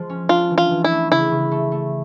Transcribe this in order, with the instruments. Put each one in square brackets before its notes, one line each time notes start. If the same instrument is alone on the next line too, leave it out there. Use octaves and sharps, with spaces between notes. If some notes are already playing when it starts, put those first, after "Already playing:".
Already playing: [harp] F3 G#3
C#4
[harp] D4 [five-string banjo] F4
[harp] E3
[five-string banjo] F4
[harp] E3
[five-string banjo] E4
[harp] A3
[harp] C#3 [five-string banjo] E4
[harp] C#3
A3
A3